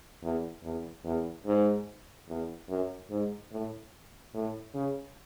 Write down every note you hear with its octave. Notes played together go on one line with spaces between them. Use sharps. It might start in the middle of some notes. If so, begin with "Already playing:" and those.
E2
E2
E2
G#2
E2
F#2
G#2
A2
A2
C#3